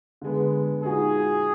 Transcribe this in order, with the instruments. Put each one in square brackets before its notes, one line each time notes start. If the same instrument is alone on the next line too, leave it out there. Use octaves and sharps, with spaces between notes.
[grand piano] D3 G#3 B3
[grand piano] A#2 G#3 D#4 F#4 [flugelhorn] G#4